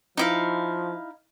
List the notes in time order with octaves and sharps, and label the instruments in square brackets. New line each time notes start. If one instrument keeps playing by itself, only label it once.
[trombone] F3 [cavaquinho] D#4 E4 F5